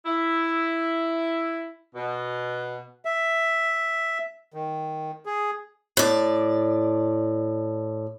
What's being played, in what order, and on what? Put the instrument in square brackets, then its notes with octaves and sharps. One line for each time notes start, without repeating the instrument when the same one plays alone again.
[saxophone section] E4
B2
[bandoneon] E5
D#3
G#4
[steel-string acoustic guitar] A2 D5